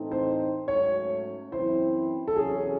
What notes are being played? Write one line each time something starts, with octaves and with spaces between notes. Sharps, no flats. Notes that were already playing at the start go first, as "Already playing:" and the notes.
Already playing: A2 E3 C4 D#4 A4
C5
G#2 F#3 A3 C#4 C#5
F#2 E3 C4 E4 C5
A4
E2 C3 F#3 C#4 G#4